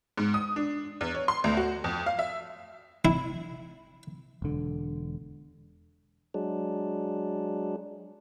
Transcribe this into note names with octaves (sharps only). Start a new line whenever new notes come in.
G#2
D#6
D4
E2
C#5
C6
D2
F#4
F2
F5
E5
E4
E1 D3
F#3 G#3 D4